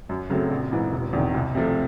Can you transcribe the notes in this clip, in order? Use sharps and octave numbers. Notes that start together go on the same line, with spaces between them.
F#2
C#3 F#3 A3 C4
A#1
G#2 E3
E1
E2 C3 D#3
C2
C3 F3 A3